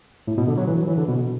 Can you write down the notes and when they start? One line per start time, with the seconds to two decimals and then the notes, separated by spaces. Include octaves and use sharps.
0.27 A2
0.38 B2
0.48 D3
0.57 F#3
0.67 E3
0.78 F#3
0.87 E3
0.98 D3
1.08 B2